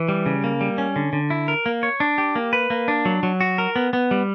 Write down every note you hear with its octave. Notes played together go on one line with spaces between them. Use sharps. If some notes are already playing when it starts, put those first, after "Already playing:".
Already playing: E3
G3
C#3
A#3
G3
C#4
D3
D3
E4
A#4
A#3
C#5
D4
G4
A#3
B4
A#3
D4
F#3
F#3
F#4
A#4
B3
B3
G3